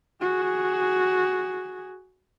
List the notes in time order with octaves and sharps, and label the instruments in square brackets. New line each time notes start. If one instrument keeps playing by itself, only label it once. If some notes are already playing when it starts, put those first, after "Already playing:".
[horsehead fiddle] F#4 G#4